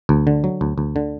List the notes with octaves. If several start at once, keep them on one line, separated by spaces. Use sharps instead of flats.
D2
D3
F#3
D2
D2
D3